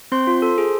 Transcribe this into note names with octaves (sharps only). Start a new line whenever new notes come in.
C4 C5 C6
F4
A4
G#4